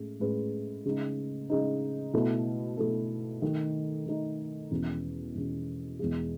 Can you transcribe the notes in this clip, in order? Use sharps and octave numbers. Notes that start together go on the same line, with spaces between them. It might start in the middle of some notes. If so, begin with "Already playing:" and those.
Already playing: A2 G#3 C#4 G#4
A2 G#3 C#4 G#4 B4
C#3 G#3 D#4
C#3 G#3 D#4
B2 A3 E4 A4
B2 A3 E4 A4
D#3 A3 D#4
D#3 A3 D#4
E2 B2 G#3 C#4
E2 B2 G#3 C#4
E2 B2 G#3